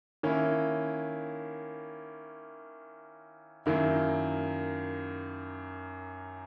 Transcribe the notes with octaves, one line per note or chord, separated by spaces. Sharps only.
D#3 A#3 C#4 E4
F#2 D#3 A#3 E4